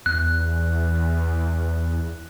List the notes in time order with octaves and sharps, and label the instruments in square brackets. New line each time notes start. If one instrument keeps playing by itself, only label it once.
[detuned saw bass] E2 [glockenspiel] F#6